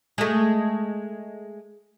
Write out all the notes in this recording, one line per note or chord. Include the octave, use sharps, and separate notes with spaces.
G#3 A3